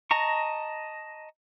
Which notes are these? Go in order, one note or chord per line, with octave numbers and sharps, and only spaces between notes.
D#5 A5 A#5 C#6